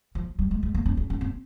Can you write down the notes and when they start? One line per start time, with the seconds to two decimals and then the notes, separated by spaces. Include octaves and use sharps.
0.15 F3
0.39 G3
0.51 G#3
0.63 G#3
0.74 A#3
0.86 C#4
0.97 C#4
1.10 C#4
1.21 C4